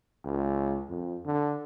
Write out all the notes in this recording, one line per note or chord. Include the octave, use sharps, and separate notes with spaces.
C#2
F2
D3